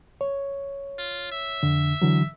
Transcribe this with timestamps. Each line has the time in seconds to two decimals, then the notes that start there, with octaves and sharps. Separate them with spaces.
0.21 C#5
0.99 F4
1.32 E5
1.63 F2 D3
2.02 D3 E3 F#3